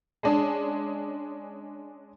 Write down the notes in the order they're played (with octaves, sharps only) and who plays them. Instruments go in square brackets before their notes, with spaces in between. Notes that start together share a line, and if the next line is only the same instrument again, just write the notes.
[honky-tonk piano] G#3 C#4 D4 G#4